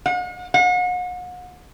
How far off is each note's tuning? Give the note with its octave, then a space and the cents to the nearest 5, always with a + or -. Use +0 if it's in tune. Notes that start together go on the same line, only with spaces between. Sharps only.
F#5 -45
F#5 -40